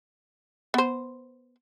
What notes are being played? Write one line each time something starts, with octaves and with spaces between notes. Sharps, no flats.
B3 C5